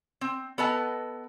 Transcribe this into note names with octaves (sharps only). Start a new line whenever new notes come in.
C4
B3 A4 B4 D#5 A5